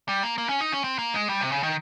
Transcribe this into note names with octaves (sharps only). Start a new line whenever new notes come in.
G3
A#3
A#3
C#4
D#4
C#4
C4
A#3
G#3
G3
C3
C#3
D#3